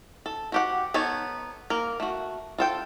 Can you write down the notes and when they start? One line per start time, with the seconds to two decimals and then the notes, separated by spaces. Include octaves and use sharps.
0.26 A4
0.52 F#4 G4 F#5
0.94 B3 D#4 A4 C#5
1.70 A#3 A#4
2.00 A3 F#4
2.58 F4 A4 G5